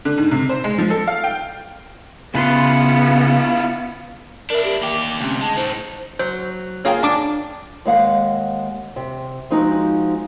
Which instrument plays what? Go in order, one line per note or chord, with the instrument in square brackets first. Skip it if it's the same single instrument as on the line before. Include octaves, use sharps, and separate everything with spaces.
[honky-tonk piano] D3
G#2
C3
C5
G#3
F3
A4
F5
G5
[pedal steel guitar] C#3 B4 C6 [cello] B3 [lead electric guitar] E4 F4
[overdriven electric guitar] D4 E4 [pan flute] A#4
[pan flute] G4
[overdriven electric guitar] A#3 G4 [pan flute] D6
[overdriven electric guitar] D2 C3 [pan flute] C#4
[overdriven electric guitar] G#3 [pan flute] A5
[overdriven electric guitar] A2 D#4 [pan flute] C5
[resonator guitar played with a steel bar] F#3 [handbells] C5
[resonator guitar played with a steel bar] A#3 F4 G#4 [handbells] C#5 F5 G5
[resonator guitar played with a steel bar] D4 [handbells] A5 D6 D7
[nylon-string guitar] D#2 G#3 F5 F#5
C3
F3 G#3 C4 D#4 F#4